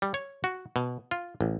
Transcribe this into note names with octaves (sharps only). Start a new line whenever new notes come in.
G3
C#5
F#4
B2
F4
A1